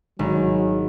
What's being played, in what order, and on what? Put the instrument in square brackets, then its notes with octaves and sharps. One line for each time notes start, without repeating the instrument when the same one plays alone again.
[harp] G#1 [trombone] F#3